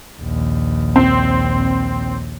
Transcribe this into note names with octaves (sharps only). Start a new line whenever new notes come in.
A#1 D#2
C4